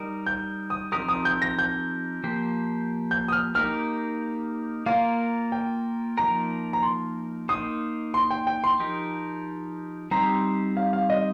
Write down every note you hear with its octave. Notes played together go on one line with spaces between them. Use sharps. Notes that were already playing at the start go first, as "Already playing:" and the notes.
Already playing: G3 D#4 A#4
G6
D#6
F3 C4 D#4 G4 A#4 D#6
D#6
G6
A#6
G6
F3 A#3 G4 C5
G6
D#6
F6
A#3 D#4 G4 A#4 F6
A#3 F4 A#4 F5
G5
F3 A#3 D#4 A#4 A#5
A#5
C6
A#3 D#4 C5 D#6
C6
G5
G5
C6
F3 D#4 G4 A#4
G3 C4 D#4 G4 C5 A#5
F5
F5
D#5